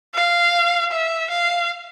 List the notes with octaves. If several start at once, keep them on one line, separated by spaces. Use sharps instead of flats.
F5
E5
F5